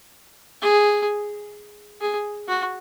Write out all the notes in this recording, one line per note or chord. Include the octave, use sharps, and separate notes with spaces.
G#4
G#4
F#4